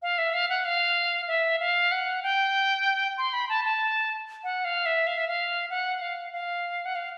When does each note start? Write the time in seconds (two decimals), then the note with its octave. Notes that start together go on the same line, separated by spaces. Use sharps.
0.02 F5
0.18 E5
0.34 F5
0.50 F#5
0.65 F5
1.28 E5
1.60 F5
1.92 F#5
2.23 G5
3.18 C6
3.33 B5
3.49 A5
3.65 A5
4.44 F#5
4.65 F5
4.86 E5
5.07 F5
5.17 E5
5.28 F5
5.70 F#5
6.01 F5
6.33 F5
6.85 F#5
6.95 F5